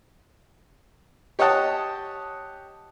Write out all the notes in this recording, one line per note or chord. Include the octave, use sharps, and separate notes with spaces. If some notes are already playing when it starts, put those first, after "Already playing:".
G4 C#5 D#5 F#5 A5